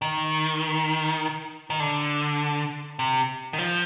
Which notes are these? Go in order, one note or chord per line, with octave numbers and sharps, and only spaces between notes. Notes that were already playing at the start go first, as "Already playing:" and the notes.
D#3
D#3
D3
C3
D#3
F3